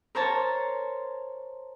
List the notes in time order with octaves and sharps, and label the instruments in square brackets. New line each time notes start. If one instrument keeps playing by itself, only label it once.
[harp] A#4 C5 C#5 A5